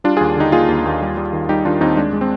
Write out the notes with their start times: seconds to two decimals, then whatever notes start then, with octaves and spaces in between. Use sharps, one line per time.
0.04 G3 D4 F4
0.17 F4 G#4
0.21 D#2
0.36 D3 D#4 G4
0.52 A#3 F4 G#4
0.68 D#2
0.85 D#2
1.02 G3
1.17 G3
1.33 D#3
1.49 G3 D#4 G4
1.65 D#3 D4 F4
1.81 D#2 C4 D#4
1.97 G#3 D4
2.13 G#3
2.21 C4